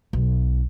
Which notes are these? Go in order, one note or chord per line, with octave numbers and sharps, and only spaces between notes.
B1